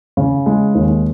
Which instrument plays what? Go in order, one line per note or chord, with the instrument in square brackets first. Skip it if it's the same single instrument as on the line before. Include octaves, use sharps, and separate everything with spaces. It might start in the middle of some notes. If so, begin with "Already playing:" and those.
[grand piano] C#3
G#3
D#2